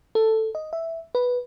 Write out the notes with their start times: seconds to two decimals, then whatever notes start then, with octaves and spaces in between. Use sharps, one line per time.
0.15 A4
0.55 D#5
0.73 E5
1.15 B4